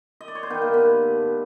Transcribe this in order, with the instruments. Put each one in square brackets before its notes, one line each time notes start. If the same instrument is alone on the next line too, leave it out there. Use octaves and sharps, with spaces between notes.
[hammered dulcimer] D#5
D5
C#5
C5
D#3 B3 B4
A#3 A#4
G2
B3 B4
G2
G2
A2